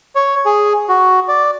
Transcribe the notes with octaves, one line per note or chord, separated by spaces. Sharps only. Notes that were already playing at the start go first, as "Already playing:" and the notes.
C#5
G#4
F#4
D5